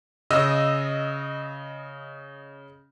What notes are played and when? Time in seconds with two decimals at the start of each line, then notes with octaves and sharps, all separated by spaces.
0.30 C#3 D#5 E6